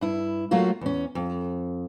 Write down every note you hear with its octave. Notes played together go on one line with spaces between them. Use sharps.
G2 E4
F#3 A3 A#3 F4 F#4
E2 C#4
F2